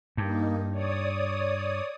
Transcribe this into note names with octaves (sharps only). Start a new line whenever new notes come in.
G2 A#3 D#4
C#5 D5 D#6